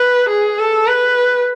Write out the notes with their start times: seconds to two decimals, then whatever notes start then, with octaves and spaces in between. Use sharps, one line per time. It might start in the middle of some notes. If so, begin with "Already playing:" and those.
Already playing: B4
0.29 G#4
0.58 A4
0.87 B4